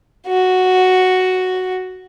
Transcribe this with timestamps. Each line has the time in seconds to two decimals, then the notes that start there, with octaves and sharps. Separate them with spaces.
0.27 F#4